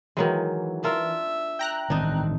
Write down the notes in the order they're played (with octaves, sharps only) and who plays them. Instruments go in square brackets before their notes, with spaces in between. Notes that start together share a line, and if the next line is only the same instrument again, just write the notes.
[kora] D#3 F#3 G#3 [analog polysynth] E3
[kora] D4 F4 A#4 [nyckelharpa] E5
[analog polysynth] G5 A#5 F#6
[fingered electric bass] A1 D#3 [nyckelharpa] C4 [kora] D4 D#4